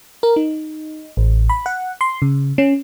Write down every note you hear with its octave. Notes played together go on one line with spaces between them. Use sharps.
A#4
D#4
A1
B5
F#5
C6
C#3
C#4